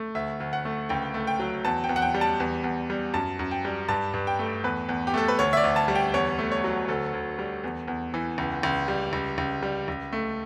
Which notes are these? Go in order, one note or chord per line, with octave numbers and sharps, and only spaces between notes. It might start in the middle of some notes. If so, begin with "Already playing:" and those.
Already playing: A3
D2 E5
D2
F#5
A3
C#2 G5
A3
G5
F#3
E2 A5
G5
E2
F#5
G5
G3
A5
E2
E2
G3
F#2 A5
F#2
G5
G3
G2 A5
G2
G5
A3
E2 B4
E2
G4
A3 A4
B4
D2 C#5
E5
D5
D2
A5
G3
G5
E2 C#5
A3
C#5
F#3
D2 A4
D2
G3
E2
E2
E3
C#2
C#2
G3
C#2
C#2
G3
C#2
A3